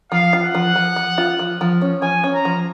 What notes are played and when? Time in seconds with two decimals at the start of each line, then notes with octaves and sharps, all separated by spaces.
0.12 F3 F5
0.33 F4
0.44 F#5
0.55 F3
0.76 F3
0.96 F3
1.18 F4
1.39 F3
1.61 F3
1.81 C#4
2.02 F3 G#5
2.24 C#4
2.34 A#5
2.45 F3